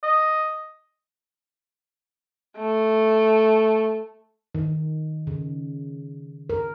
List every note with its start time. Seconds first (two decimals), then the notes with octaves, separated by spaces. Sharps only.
0.03 D#5
2.58 A3
4.55 D#3
5.27 C#3
6.50 A#4